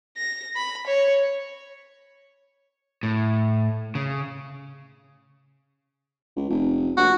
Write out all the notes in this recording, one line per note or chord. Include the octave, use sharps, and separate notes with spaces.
A#6
B5
C#5
A2
C#3
C#2
F1
A#1 F#4